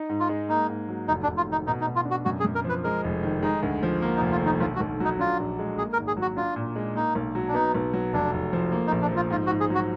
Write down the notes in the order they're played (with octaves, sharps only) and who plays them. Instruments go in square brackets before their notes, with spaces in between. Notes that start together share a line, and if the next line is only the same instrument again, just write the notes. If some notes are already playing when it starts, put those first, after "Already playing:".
Already playing: [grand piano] D#4
G#2
[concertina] F4
[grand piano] G#3
[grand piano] A#3 [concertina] D#4
[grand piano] G#2
F#3
[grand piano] F1 [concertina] D#4
[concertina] D4
[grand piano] F1
[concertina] F4
[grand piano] D#3 [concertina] D#4
[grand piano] B2 [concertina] D#4
[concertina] D#4
[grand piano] B2
[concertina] F4
[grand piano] D4
[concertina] F#4
[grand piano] F#2 [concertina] F#4
[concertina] G#4
[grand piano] F#2
[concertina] A#4
[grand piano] F3
[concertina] B4
[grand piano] G#3 [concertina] A#4
[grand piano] F1
D#3
[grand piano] G#3 [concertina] D#4
[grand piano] D2
F3
A#3
[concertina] D#4
[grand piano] F1
[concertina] F4
[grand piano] D#3 [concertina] D#4
[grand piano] B1 [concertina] F4
[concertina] F#4
[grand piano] B1
[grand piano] F#3 [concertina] D#4
[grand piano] D4 [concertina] F4
[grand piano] A#1
G#3
[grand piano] A#3 [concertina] G#4
[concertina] A#4
[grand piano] G#1
[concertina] G#4
[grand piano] F#3
[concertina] F#4
[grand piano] D4 [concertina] F4
[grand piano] A#2
G#3
[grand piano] A#3 [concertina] D#4
[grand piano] B1
F#3
[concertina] D4
[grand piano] B3 [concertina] D#4
[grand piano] B1
F#3
[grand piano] F1 [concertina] D4
[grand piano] F1
F3
A#3
[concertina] D#4
[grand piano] A#1
[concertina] D4
[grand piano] F3 [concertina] F4
[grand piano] G#2 [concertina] F4
[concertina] F#4
[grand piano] G#2
[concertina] G#4
[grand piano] F#3 [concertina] F#4